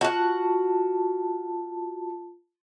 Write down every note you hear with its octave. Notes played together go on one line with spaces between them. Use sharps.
F4 F#4 F#5 A5